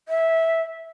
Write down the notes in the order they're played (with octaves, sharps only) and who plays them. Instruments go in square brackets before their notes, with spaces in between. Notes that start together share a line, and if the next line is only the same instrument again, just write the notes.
[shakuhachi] E5